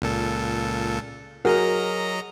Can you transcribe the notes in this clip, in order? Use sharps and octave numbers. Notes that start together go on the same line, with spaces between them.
C#2 A#2 A4
F#3 F#4 G#4 A#4 D#5 A#5